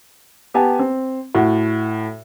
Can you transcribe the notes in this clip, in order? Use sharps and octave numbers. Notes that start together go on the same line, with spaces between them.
B3 G4 G#5 A5
C4
A2 F#4